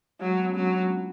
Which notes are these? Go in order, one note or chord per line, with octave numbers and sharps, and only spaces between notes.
F#3 G#3
A3
B3
C#4
F#3 D4
F4
D4